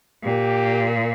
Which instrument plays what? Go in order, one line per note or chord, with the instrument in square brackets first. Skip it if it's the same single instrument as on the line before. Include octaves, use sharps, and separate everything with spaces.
[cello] A#2 [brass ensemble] G4